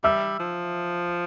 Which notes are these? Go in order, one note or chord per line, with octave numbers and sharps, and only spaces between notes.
G3 E5 E6
F3